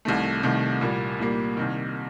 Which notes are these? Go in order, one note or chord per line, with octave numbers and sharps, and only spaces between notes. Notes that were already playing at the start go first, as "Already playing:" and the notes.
C2 C3 D#3 A3
C2 C3 D#3 A3
C2 A#2 G3 A#3
C2 A#2 G3 A#3
C2 C3 D#3